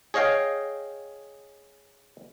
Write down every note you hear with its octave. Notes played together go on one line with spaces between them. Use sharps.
G#4 C#5 D#5 F5 G5